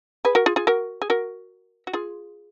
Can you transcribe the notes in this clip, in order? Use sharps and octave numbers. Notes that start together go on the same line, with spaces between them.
G#4 B4
F#4 A#4
F4 G#4
F4 G#4
F#4 A#4
G#4
F#4 A#4
F#4
F4 G#4